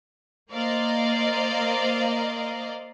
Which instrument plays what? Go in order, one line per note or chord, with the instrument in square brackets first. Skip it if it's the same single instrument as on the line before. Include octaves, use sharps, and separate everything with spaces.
[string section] A#3 A#4 C5 D5 D#5 F5